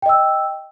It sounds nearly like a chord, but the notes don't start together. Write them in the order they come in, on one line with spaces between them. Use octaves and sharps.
G5 D#5 E6